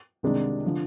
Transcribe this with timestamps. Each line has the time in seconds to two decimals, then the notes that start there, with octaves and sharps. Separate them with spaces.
0.23 C2 C3 D#3 G#3 D4
0.65 D3 F3